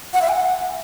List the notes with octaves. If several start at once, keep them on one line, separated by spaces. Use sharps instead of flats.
F#5
E5
G#5
F#5